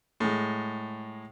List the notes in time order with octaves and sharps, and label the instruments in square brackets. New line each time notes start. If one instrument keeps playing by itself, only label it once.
[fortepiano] A2 G#3